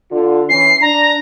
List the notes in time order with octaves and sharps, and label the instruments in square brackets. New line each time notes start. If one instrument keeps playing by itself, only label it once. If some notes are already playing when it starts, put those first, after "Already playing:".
[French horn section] D3 F4
[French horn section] E3 C#4 [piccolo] C7
[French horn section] D4 [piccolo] A#5